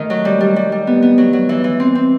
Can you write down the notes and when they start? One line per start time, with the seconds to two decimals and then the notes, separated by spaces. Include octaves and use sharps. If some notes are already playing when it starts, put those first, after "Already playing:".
Already playing: D#3 A3
0.10 F#3
0.25 G3
0.41 G3
0.56 G3
0.72 G3
0.87 B3
1.02 B3
1.18 F#3
1.33 F#3
1.49 E3
1.64 E3
1.80 C4
1.95 C4